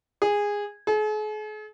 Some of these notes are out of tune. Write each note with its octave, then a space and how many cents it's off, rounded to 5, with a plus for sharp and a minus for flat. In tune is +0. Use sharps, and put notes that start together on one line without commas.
G#4 -15
G#4 +45